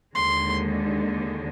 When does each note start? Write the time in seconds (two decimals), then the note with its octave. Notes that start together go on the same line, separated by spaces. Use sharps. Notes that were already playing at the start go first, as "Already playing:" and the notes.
0.15 D#2 D3 G#3 C6